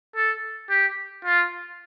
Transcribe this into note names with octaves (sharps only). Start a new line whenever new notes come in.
A4
G4
F4